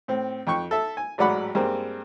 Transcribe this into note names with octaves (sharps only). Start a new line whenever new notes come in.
A2 C4
F2 G5 C#6
A4 E5
G#5
A1 G#2 F#3 D5 F#5 B5
G2 G#3 A#3 C4